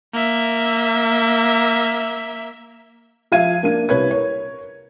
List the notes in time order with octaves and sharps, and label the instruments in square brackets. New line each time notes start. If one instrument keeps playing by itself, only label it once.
[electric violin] A#3 E5
[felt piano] F3 E5 F5 G#6 D#7
A#3 D4 D#7
C2 B4 C#5 G#6
A#4 C#5